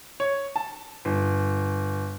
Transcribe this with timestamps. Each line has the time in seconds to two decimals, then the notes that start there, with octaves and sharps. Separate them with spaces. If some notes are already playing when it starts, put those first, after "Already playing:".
0.20 C#5
0.56 A5
1.05 G1